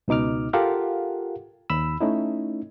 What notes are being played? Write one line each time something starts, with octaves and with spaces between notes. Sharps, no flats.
C#2 B2 D#4 D6 F6
F4 G4 A4 A#4 F5 F#5
D#2 B5 E6
A3 C#4 D#4 E4